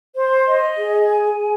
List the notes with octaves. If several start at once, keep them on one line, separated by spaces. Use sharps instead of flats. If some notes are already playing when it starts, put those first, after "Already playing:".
C5
D#5
G#4
G#5
G#4